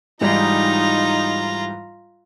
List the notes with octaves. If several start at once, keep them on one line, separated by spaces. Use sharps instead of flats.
G#2 E3 G3 D#4 F4 A#5